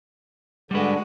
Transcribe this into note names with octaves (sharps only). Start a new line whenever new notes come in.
D3 G3 G#3 F#4 B4